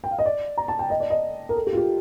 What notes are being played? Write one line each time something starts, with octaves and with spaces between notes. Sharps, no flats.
G5
F5
D#5
D5
A#5
A5
G5
D#5
D5
D#5
A#4
A4
G4
F4
G4